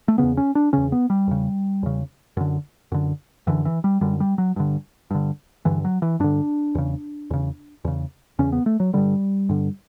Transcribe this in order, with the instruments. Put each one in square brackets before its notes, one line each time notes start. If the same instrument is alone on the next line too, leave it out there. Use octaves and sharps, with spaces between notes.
[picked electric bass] A3
E2 C#3 B3
C#4
D4
E2 C#3 C#4
B3
G3
E2 C#3
E2 C#3
F#2 D3
F#2 D3
F#2 D3 E3
E3
G3
F#2 D3 G3
G3
F#3
G2 D3
G2 D3
G2 D3 E3
F#3
E3
G2 D3 D4
E2 C#3
E2 C#3
E2 C#3
E2 C#3 C#4
B3
A3
F#3
G2 D3 G3
G2 D3